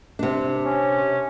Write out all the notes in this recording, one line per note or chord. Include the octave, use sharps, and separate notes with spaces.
C3 D4
C#4